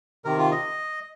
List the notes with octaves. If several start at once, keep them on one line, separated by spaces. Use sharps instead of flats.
C3 D#3 A#4
F4
D#5